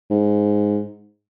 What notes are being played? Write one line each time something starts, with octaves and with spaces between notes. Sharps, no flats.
G#2